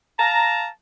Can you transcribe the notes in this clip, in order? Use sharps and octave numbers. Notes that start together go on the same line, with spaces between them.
F5 A5 A#5